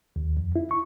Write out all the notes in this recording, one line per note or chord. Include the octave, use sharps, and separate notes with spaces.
D#2
F2
E4
C#6